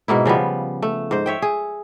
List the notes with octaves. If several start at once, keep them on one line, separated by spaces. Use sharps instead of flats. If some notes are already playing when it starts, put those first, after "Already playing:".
G#2 B2 A#3 E4
C#3 F3 G3 B3
A3
G#2 C5
C#5 E5 G5
G#4